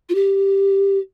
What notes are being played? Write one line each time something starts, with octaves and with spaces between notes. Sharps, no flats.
F4
G4